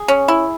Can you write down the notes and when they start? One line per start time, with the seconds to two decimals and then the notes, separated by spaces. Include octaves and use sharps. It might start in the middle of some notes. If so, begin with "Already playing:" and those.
Already playing: G#4
0.08 C#4
0.28 E4